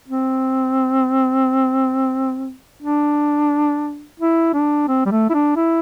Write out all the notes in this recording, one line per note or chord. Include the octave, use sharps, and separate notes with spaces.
C4
D4
E4
D4
C4
G3
A3
E4
D4
E4